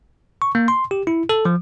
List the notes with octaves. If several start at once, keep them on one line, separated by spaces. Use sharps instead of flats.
C#6
A#3
C6
G4
E4
A4
F3